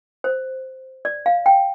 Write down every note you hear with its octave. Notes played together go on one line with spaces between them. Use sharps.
C5
D5
F5
G5